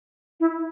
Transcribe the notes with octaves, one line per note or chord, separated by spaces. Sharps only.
E4